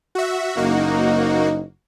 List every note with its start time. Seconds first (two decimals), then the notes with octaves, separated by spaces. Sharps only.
0.15 F#4 E5
0.57 F#1 A#3 D#4 F#4